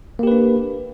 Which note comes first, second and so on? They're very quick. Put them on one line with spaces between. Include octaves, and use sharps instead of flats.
A#3 G4 B4 D4